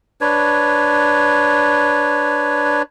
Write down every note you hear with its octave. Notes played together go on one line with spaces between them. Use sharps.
D4 B4 C#5